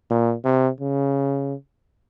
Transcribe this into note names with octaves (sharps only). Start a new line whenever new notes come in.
A#2
C3
C#3